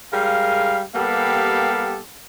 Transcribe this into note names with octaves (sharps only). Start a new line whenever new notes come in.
G3 G#3 A#4 F5
G3 A#3 B3 G4 A4 F5